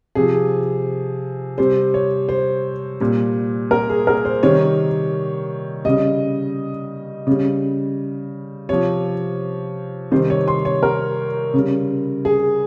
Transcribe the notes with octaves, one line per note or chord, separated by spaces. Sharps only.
C3 F3 G#4
C3 G3 C5
C#5
C5
A#2 G3
A#4
G#4
A#4
C5
C3 D#3 G3 C#5
C#3 G3 D#5
C#3 G3
C3 F3 C#5
C3 D#3 G3 C5
C#5
C6
C#5
A#4
C#3 G3
G#4